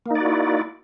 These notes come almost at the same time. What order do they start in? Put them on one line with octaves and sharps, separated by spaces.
A#3 D#4 D5 F#4 E4